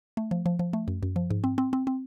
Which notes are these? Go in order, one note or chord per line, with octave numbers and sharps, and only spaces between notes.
A3
F3
F3
F3
A3
F#2
F#2
F3
G#2
C4
C4
C4
C4